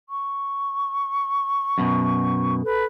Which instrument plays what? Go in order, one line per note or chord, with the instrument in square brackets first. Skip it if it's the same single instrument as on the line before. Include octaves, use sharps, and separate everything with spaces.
[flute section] C#6
[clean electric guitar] F#2 B2
[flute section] A4 B4